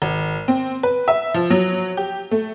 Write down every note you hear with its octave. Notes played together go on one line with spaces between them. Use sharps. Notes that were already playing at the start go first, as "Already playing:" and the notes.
G#1
C4
B4
E5
F3
F#3
G4
A3